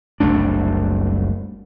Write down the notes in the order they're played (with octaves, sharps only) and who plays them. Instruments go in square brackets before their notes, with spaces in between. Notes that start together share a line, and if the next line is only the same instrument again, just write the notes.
[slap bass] F#1 C2 A3 D4